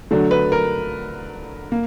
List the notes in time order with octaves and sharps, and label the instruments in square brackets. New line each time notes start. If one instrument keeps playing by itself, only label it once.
[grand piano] D3 F#3 A3
B4
A#4
A#3